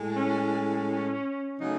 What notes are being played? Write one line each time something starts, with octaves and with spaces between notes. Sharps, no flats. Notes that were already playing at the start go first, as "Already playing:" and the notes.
Already playing: A2 G#3
C#4
C#3 F#3 A3 D#4